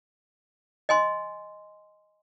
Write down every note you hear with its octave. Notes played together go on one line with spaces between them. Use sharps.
D#5 G#5 C6